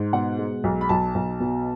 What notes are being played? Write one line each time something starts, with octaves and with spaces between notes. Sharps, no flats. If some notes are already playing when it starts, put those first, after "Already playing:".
Already playing: G#2
B2 F#5
G#3
B1
B5
B1 A5
B1
B2